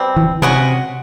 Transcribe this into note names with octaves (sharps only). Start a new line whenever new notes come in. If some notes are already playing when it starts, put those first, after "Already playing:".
Already playing: B2 G3 C4
E3
C3 G#3 C#4 F#4